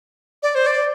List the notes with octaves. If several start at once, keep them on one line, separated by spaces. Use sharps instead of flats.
D5
C5
D5